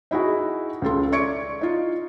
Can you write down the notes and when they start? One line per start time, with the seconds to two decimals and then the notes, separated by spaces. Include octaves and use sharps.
0.11 D#4 E4 F#4 G#4
0.82 C#2 C#3 A4 C6
1.12 D5 E5 C#6 G#6 C#7 D7
1.61 D#4 F4